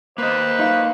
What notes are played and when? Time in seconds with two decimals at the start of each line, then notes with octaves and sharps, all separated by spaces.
0.18 A#3 B4 C5 D#5
0.59 D#4 F5